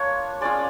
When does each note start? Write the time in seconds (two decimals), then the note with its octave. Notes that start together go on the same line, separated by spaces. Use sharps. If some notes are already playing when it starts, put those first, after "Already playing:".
Already playing: A#3 D4 F4 C#5
0.41 G#3 C#4 F4 D5